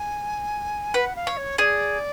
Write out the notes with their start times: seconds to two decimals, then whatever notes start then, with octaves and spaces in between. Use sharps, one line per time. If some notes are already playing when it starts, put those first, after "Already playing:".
Already playing: G#5
0.94 B4 F#5
1.16 F5
1.27 C#5
1.37 C#5
1.58 G#4 D5